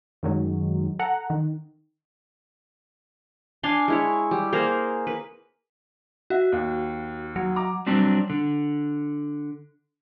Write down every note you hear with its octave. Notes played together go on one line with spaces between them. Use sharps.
F#2 D#3 F#3 G#3
A4 F#5 A#5
D#3
D4 F5 G#5 C6
G#3 E4 C#5
G3
A#3 G#4 A#4 C5
B4
F#4 E5
D#2
F#3
A#5 D6
F#3 G3 C4 D4
D3